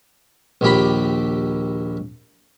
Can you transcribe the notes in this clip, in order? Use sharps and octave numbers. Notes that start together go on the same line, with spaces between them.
A#1 D#2 G4 B5